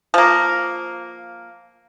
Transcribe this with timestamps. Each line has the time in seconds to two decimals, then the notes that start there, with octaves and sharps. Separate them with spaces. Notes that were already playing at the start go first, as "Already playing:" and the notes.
0.14 F3 A#3